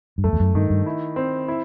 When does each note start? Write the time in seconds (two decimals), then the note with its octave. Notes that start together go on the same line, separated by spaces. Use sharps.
0.18 G2
0.24 F#2 A3
0.33 E2
0.40 F#2
0.54 G2 D#3
0.70 G2
0.86 E4
1.16 C4
1.48 E4